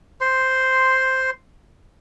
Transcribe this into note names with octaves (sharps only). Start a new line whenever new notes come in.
C5 C6